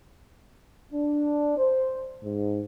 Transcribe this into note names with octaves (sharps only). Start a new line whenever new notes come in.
D4
C5
G#2